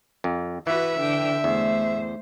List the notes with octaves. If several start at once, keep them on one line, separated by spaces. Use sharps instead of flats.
F2
E3 F#4 B4 E5
D3 G5
E2 A3 C5